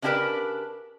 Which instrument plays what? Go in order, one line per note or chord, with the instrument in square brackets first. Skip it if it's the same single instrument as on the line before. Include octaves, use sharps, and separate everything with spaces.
[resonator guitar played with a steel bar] C#3 D4 E4 G4 A#4 B4